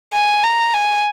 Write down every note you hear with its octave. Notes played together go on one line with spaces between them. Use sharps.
G#5
A#5
G#5